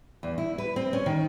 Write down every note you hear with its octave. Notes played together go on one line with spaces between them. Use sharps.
E2
E4
B4
C4
C#4
D#3